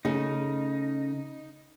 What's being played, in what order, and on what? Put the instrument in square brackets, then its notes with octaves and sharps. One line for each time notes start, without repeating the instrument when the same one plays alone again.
[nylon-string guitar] C#3 A3 C#4 [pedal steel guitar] D#4